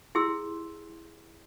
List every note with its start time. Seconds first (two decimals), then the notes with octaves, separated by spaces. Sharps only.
0.15 E4 G4 G#4 C6 E6